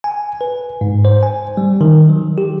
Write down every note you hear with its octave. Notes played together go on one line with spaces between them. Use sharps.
G#5
B4
G#2
C5
G#5
G3
D#3
F#3
G4